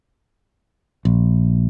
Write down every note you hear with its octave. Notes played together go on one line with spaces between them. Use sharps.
A#1